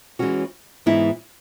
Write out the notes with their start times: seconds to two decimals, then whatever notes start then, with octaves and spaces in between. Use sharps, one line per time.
0.19 E3 G#3 C#4 F#4
0.86 G#2 E3 B3 E4